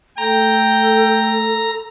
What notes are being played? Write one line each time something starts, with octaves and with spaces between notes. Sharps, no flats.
A3 A4 G5 A#5